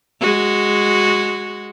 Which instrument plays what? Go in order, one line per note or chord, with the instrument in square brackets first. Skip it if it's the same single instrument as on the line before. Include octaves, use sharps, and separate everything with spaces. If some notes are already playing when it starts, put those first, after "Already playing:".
[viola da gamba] G#3 F#4